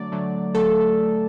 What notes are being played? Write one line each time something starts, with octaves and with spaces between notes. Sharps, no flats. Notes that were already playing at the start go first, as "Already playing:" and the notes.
Already playing: D3 F#3 A3 D5
D3 F#3 A3
D3 F#3 A3 A4